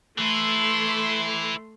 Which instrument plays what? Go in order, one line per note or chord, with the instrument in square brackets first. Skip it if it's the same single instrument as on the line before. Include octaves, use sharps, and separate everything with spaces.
[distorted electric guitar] E3 E4 [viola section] A3 C6